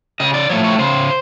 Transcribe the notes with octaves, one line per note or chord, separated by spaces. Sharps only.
C#3 D#5
D5
F3 A3 C#5
C#5
C#3 C5